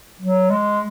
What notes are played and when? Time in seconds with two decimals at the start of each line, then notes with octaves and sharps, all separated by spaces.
0.21 F#3
0.50 G#3